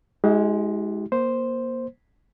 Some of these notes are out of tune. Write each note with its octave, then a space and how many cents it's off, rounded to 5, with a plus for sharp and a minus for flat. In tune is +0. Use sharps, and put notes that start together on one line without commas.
G#3 +10 E4 -30 G4 -40
A#3 +25 C5 +0